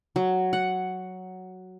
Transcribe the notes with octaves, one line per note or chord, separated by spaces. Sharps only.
F#3
F#5